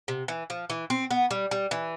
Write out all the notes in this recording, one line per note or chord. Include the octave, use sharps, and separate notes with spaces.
C3
E3
F3
E3
C4
B3
G3
G3
E3